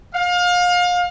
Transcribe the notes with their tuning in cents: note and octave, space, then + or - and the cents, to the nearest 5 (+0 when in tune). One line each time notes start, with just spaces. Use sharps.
F5 +30